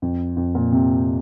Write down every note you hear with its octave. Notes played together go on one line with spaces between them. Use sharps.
F2
F2
A#2
C3